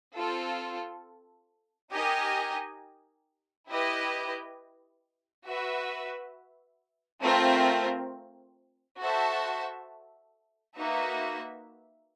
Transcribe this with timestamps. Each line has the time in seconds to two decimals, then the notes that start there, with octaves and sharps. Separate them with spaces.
0.15 C4 F4 A4
1.92 D#4 G4 A#4 D#5 G#5
3.68 E4 G4 B4 D#5
5.46 F#4 B4 E5
7.22 A3 C4 F4 A#4
8.99 F#4 A4 C5 E5 A5
10.76 A#3 D#4 F#4 B4 E5